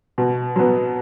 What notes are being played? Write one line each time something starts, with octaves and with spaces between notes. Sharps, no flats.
B2
F#3 B3